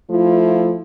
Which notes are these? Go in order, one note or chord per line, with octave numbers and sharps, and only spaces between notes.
F3 A3 E4 F4